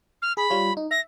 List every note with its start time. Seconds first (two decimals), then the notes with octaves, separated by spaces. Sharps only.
0.22 F6
0.37 G#4 B5
0.50 G3 F4 C#5
0.77 D#4
0.91 E5 A#6